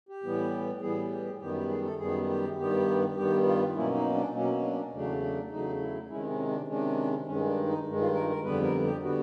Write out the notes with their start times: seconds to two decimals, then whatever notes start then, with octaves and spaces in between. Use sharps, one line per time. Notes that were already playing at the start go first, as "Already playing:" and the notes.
0.09 G4
0.23 A2 E3 G3 B3
0.81 A2 E3 G3 B3 G#4
1.10 G4
1.40 F#2 D#3 G3 B3 G4
1.55 G4
1.70 G#4
1.84 A4
1.99 F#2 D#3 G3 B3 G#4
2.29 G4
2.58 G2 D#3 G3 B3 G4
3.16 G2 D#3 G3 B3 G4
3.45 F4
3.75 B2 F#3 A#3 C#4 E4
3.94 D#4
4.15 D4
4.33 B2 F#3 A#3 C#4
4.62 D4
4.92 E2 C#3 F#3 A3 D4
5.22 D4
5.50 E2 C#3 F#3 A3 D#4
5.80 E4
6.09 C3 D#3 G#3 C#4 E4
6.30 C#4
6.48 D4
6.67 C3 D#3 G#3 C#4 D4
7.27 G2 D#3 G#3 C#4
7.46 D4
7.66 D#4
7.86 G2 D#3 G#3
8.01 F4
8.14 A#4
8.30 A#4
8.44 F2 D3 G3 B3 B4
8.63 A#4
8.83 G4
9.03 D3 G3 B3 F#4